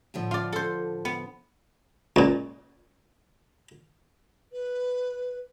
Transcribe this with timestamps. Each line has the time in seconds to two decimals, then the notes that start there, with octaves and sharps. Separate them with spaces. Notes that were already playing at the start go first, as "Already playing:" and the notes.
0.14 A2 D3 F3
0.31 F4 D5
0.53 A4 C5
1.05 B3
2.16 C#2 A#2
4.51 B4